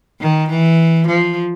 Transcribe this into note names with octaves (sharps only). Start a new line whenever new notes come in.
D#3
E3
F3